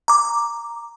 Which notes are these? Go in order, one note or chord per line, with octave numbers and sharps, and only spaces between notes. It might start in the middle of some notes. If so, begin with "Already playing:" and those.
A#5 D6